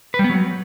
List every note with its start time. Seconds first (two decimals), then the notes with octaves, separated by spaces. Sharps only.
0.14 B4
0.19 G3
0.24 B3
0.29 F#3